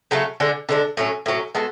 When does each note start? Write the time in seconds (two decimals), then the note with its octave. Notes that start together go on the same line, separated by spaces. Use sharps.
0.11 C#3 F#3 A3 C#4
0.40 D3 G#3 D4
0.69 D3 G#3 D4
0.97 A2 F#3 C#4
1.26 A2 F#3 C#4
1.55 G#3 B3 F#4 A4